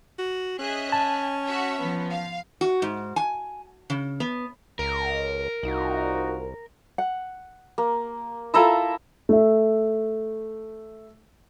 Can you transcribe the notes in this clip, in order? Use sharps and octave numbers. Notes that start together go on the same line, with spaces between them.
F#4
C#4 G#4 D#5 E5 F#6
G#5 A5
F#4 E5
F3 B3
F5
F#4
G#2
G#5
C#3
B3
C#2 A#4
C2 D#4 F4 F#4
F#5
A#3
E4 F4 A4 E5 A5 A#5
A3 E5